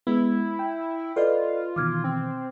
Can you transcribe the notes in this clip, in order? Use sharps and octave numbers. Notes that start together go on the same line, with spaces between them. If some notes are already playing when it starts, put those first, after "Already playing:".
G#3 B3 E4
G5
F4 A4 B4 D5 D#5
B2 D#3 E3 D6 F6 G#6
C4